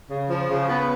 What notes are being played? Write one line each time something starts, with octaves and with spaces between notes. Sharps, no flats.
C#3
F3
C#3
B3